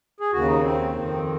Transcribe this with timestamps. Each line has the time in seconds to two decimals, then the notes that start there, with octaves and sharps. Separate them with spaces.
0.20 G#4
0.32 D#2 C#3 F#4
0.47 D#4
0.63 C4
0.94 F2 D#3